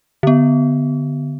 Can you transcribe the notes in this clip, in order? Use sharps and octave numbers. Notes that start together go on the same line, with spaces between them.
D3 B3